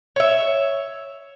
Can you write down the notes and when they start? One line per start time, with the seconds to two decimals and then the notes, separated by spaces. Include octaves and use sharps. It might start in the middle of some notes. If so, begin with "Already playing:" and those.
0.16 C#5 E5